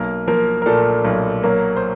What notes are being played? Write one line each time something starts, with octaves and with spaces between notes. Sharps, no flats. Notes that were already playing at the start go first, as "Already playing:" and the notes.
Already playing: B1 A#3 A#4
F3 A#3 A#4
A#4
A#2 A3 A4
B1
F#3 A#3 A#4
C5